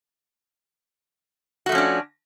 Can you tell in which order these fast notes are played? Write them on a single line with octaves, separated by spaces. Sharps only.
F#4 A3 F3 C#4 D4